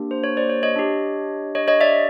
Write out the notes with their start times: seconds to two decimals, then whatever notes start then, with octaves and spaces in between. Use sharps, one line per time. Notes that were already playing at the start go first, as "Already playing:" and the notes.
Already playing: A#3 D4 G4
0.11 C5
0.24 C#5
0.37 C5 D5
0.50 C#5
0.63 C#5 D#5
0.76 D4 G4
1.55 C#5 D#5
1.68 C#5 D#5
1.81 D5 E5